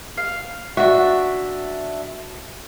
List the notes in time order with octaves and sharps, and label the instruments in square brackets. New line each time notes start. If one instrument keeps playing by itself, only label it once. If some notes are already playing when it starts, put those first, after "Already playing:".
[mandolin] F5
[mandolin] D4 E5 [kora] F#4